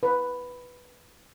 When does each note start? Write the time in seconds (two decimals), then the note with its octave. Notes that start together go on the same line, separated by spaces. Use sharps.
0.03 B4